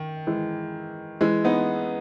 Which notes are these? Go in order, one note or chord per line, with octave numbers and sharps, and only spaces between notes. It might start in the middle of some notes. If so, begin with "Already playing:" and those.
Already playing: D#3
E3 G#3
E3 G#3
B3 D#4